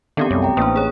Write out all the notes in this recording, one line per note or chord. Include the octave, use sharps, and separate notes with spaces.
D3 D#3 B3 C4 G4
C2 F#2 G3 A3 C#5
G5 A#5
A1 A#3 C4 D4 B4 D#6
G#4 C#5